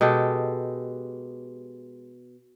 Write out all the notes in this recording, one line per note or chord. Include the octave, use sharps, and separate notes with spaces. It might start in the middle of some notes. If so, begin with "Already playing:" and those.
B2 G#3 G4 A4